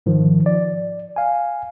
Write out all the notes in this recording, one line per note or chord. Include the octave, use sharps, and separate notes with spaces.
G#2 D#3 F3
D5
F5 G#5